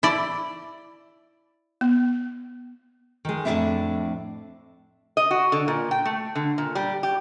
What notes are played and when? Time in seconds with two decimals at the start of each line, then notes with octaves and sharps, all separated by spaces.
0.03 E4 D5
1.81 B3
3.25 D#3 G#3
3.45 F2 A2 C4 D4 E4 E5
5.17 D#5
5.31 F#4
5.52 D3
5.68 A#2
5.91 G5
6.05 A3
6.35 D3
6.58 A#2
6.75 G3
7.03 G4